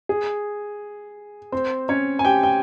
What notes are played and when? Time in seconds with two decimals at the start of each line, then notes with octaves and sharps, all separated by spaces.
0.09 G#4
1.52 C4 C5
1.89 C#4 C#5
2.19 G#5
2.25 G4 G5
2.43 G5